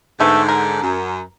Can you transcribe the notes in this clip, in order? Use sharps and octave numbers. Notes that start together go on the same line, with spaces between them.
G#2 D3 A3 B3
A#4
F#2